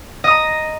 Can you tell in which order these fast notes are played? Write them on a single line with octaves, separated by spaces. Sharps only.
D#5 D#6 A#5